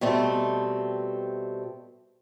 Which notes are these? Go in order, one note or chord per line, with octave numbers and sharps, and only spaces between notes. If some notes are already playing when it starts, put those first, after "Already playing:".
B2 G3 A3 C4